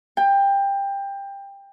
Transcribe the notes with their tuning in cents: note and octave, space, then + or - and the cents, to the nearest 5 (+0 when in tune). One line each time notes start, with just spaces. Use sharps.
G5 +20